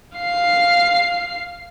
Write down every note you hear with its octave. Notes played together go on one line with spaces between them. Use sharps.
F5 C7